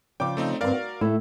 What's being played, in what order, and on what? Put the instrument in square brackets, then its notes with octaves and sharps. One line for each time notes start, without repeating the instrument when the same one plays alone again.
[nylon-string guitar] C#3 F3 D5 [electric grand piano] G5 D6
[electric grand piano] A3 C4 D#4
[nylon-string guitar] D2 G2 C4 [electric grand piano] A#4 D5 F5
[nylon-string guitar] F#4
A2 A3 E4